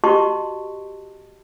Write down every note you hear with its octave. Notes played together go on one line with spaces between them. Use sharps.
F#4 G4 D#5 A5 C6 C#6